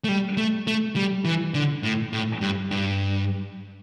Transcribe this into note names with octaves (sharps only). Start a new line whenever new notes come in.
A3
G3
A3
A3
G3
E3
D3
A2
A2
G2
G2